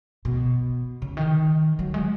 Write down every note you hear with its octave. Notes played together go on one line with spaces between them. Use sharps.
B2
C#3
D#3
F#3
G#3